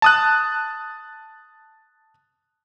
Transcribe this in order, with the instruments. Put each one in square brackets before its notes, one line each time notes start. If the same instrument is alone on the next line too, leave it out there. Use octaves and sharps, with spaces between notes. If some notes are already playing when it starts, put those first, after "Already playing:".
[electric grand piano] A5 D#6 F#6